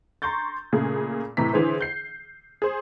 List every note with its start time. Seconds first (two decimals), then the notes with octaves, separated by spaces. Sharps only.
0.22 A#5 C6 C#6 G6 A6
0.73 A#2 C#3 A3 G#4
1.37 A2 C3 E3 A#5 B6
1.53 D3 E3 G#4 C5
1.81 G6 C7
2.62 G#4 C5